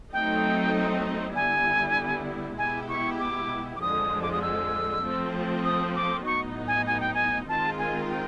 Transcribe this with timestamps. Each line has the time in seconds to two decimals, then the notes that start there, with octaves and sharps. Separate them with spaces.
0.12 F#3 A3 C4 D#4 G5
1.35 D3 G3 B3 E4 G#5
2.58 B2 G#3 B3 E4 G4 G#5
2.88 C#6
3.20 D6
3.76 D6
3.81 F2 D3 F3 G#3 D#6
4.22 D6
4.32 D#6
4.42 E6
5.03 F3 A3 C4
5.65 D#6
5.95 D6
6.26 A2 F#3 B3 D#4 C#6
6.67 G#5
6.87 G#5
7.00 G5
7.14 G#5
7.49 D#3 G#3 C4 F4 A#4 A5
7.79 G#5
8.09 G5